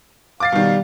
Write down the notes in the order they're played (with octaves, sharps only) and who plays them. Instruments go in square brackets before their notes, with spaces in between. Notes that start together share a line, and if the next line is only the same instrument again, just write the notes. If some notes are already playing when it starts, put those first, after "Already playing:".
[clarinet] F5 [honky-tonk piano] D6 A6 C7
[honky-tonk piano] B2 D#3 [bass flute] G3